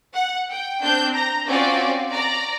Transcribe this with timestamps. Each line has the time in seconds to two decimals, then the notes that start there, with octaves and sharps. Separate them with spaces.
0.15 F#5
0.51 G5
0.82 C4 D4 G6
1.16 A#5
1.49 C4 C#4 F4 F#4 D5
2.12 D5 A#5